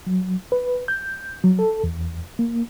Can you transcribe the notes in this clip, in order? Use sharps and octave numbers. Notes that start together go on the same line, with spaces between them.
F#3
B4
G6
F#3
A4
E2
A#3